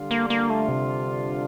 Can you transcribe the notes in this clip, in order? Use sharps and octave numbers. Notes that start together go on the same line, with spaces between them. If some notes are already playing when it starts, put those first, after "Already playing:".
Already playing: D3 G3 D4 F4
A#3
A#3
A3
C3